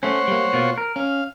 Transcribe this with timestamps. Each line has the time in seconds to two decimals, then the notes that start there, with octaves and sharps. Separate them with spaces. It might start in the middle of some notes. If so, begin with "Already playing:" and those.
0.03 A3 C#4 C5 C#5 F#5
0.28 G3 A#3
0.53 B2 A#3 F4
0.78 A#4
0.96 C#4 F5